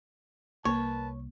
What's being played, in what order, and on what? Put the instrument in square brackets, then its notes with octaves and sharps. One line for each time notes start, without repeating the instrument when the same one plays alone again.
[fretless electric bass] C2 [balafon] A#3 [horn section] A#4 B4 A5 [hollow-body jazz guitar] C#5